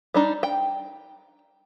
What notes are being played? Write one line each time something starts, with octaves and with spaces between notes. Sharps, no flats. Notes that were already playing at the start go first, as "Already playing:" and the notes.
G3 D4 D#4
G5